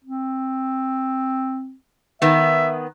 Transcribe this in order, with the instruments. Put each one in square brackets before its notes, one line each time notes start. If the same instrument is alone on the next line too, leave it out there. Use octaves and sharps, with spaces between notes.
[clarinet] C4
[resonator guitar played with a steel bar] D#3 B3 [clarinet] E5